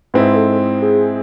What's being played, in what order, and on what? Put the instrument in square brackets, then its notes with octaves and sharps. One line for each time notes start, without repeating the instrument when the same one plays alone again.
[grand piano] G#2 G#3 C4 E4 [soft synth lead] B4
[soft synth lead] A4
G#4